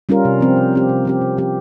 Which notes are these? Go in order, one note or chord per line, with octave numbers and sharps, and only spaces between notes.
G3 C#4 F4 A#4
C3
F3 C4 G4
C3
F3 C4 G4
C3
F3 C4 G4
C3
F3 C4 G4